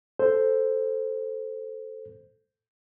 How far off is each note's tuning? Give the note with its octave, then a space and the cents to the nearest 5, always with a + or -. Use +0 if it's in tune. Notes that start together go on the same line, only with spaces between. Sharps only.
A4 +0 C5 +0